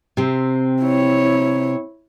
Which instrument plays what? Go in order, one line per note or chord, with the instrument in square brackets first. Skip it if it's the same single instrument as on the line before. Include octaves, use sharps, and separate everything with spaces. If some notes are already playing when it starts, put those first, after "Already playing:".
[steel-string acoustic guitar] C3 C4
[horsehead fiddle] E4 C#5